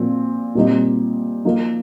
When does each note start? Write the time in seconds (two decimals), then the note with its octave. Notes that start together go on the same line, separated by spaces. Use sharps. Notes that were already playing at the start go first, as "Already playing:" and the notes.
Already playing: A#2 F3 C4 F4
0.55 A#2 G3 C4 D#4
1.45 F3 A#3 D#4